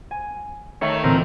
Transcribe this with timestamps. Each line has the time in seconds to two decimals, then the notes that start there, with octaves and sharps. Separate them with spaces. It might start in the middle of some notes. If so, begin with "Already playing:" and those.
0.11 G#5
0.81 D#3 A3 C#5
1.04 D2 A#2 E3 C4 A#4